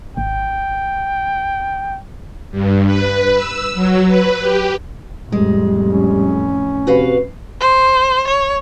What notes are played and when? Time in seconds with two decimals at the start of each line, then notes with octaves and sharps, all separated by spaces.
0.17 G#1 G5
2.51 G2
2.86 B4
3.35 E6
3.74 F#3
4.07 B4
4.40 G4
5.32 A1 F2 G3 G#3
5.92 C#4
6.87 C3 F#4 B4 F5
7.61 C5
8.27 C#5